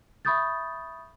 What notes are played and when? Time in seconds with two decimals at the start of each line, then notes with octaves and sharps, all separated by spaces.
0.25 E5 B5 C#6 D#6 G6 A6